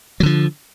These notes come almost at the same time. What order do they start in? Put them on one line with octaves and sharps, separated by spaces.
F#3 D3 F3